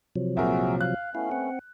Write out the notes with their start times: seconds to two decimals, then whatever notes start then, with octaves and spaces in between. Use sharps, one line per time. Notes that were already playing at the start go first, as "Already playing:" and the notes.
0.16 C3 F3 F#3
0.37 C2 A#2 F#4 G#4 A#4 E5
0.81 F5 F#6
1.15 A3 B3 C#4 E4 F5
1.31 C4 F#5